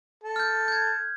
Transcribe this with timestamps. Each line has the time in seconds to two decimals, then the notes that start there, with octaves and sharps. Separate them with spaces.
0.24 A4
0.36 F6 G6
0.68 G6 G#6